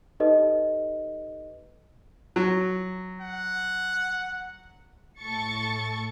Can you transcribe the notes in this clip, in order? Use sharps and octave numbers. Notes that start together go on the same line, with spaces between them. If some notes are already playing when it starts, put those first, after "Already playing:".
D#4 G4 A4 B4 D#5
F#3
F#5
A2 A4 C#6 A6 C#7